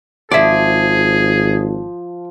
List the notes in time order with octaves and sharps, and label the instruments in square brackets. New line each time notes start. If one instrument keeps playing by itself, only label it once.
[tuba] G#1 [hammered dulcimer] F3 [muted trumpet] G#4 [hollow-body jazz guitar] D5 E5